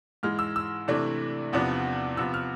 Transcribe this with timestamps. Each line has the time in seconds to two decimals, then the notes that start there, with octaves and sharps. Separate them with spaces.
0.23 G#2 E3 G#3 F6
0.39 E6
0.56 E6
0.88 C3 E3 A3 D4
1.53 E2 C3 F3 B3 D4
2.17 C3 F3 B3 E6
2.34 F6